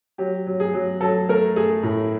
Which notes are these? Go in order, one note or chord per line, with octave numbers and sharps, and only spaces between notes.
F#3 G4
F#3
G#4
F#3
F#3 A4
A3 A#4
A3 G#4
A2